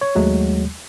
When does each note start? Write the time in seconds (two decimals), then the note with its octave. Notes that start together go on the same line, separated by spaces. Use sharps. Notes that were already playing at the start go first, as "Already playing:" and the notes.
0.01 C#5
0.15 D#2 F#3 G#3 A3